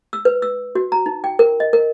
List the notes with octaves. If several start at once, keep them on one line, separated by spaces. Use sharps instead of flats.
E6
B4
E6
F#4
A#5
D#4
G5
A#4
D#5
A#4